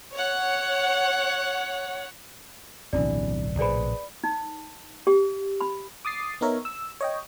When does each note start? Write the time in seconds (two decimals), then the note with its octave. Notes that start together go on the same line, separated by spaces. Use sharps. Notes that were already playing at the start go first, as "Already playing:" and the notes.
0.13 C#5 F#5
2.93 D1 B1 C3 E3 D4 D5
3.59 A#1 A2 C3 G#4 B4 C5 D5 B5
4.24 D#4
5.07 G4
5.61 B5
6.05 D6 D#6 A6 C7
6.41 B3 D#4 A#4 C#5 E5
6.65 E6
7.01 C#5 D#5 G5